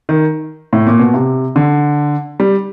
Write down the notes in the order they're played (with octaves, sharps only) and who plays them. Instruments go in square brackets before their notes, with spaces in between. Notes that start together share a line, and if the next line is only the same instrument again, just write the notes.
[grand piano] D#3
A2
A#2
B2
C3
D3
G3